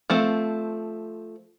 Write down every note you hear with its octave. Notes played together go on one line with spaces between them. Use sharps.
F3 A3 C4